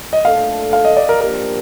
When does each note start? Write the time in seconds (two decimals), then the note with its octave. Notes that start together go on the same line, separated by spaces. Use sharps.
0.13 D#5
0.25 A#2 A3 D4 A4 F5
0.73 F5
0.85 D#5
0.97 D5
1.09 A#4
1.21 F3 A#3 D4 G4 A#4